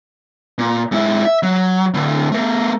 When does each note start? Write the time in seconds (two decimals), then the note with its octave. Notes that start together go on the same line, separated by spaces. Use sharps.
0.58 A#2
0.92 G#2 E4
1.25 E5
1.43 F#3
1.94 A2 D3
2.32 A3 A#4